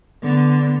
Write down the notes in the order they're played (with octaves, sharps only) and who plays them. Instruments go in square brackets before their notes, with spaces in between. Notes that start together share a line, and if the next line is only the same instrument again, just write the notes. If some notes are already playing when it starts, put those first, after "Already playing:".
[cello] D3 B3